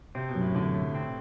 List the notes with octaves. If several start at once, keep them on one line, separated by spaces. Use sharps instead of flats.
C3 C4
B2
F#2
A2
A2 D3
A3
C4